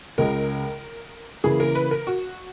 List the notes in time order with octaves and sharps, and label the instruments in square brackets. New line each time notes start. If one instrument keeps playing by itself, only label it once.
[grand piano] C#2 C#3 G#3 [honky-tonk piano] A#4
[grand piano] C#3 E3 A#3 [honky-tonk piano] G#4
[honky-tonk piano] A#4
B4
A#4
F#4